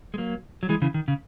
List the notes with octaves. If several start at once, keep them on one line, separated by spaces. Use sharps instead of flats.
G#3
F#3 A#3
F#3
E3 G#3
C#3 E3
D#3
C#3